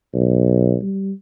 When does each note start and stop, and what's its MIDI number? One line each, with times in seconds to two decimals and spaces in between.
0.14 0.77 35
0.82 1.12 55